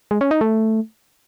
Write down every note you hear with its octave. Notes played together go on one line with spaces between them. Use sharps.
G#3
C#4
D#4
A3